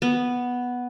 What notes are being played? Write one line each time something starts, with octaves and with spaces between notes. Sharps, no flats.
B3